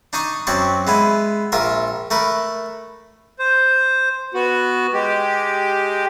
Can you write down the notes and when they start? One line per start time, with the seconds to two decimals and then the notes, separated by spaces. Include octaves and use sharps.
0.13 D4 D#4 D#5 C#6
0.47 F#2 F#3 C4 D5 C#6
0.87 G#3 B3 E4
1.52 A#1 F4 A#4 E5
2.11 A3 A#4 B4
3.39 C5
4.34 B3 F#4
4.94 G#3 G4